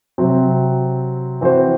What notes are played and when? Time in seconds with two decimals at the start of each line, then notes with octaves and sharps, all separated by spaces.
0.18 C3 F#3 C4
1.41 E3 C4 F#4 C5